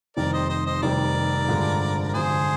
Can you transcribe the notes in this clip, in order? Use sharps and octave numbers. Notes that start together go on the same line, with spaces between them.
F1 F2 D#3 G3 A#4 D5
C5 D#5
C5 D#5
C5 D#5
F1 F2 D#3 G3 A#4 D5
G1 G2 D3 F3 G#3
A#4
G1 G2 D3 F3 G#3 G#4 C5